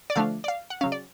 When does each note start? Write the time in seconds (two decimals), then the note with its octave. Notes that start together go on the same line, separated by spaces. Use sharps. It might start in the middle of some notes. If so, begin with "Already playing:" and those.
0.10 D5
0.16 D3 F3 A3 D4 F5
0.44 D5
0.48 F5
0.70 F#5
0.81 C#3 F#3 C#4 F5
0.92 D5